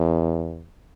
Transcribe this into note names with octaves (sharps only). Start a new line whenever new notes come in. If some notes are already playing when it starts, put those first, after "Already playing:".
Already playing: E2